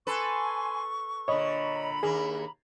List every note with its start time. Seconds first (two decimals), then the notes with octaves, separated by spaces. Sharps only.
0.07 A4 B4 G#5 C6 C#6
1.28 A#2 D3 C#5 D#5 A#5 B5
2.03 D#2 A#3 G#4